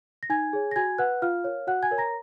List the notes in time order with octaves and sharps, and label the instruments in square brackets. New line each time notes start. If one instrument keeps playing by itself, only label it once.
[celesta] A#6
D#4 G#5 G#6
G#4 C#5
A#6
F#4 G#5 G#6
B4 F#5 F#6
F4 F5 F6
A#4 C#5
F#4 F#5 F#6
G#5 G#6
A#4 C#5
A#5 A#6